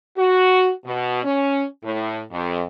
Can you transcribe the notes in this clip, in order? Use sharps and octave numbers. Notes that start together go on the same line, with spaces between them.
F#4
B2
C#4
A2
F2